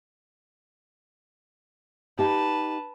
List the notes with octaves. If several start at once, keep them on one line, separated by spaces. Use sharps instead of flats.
D#4 G4 B4 A5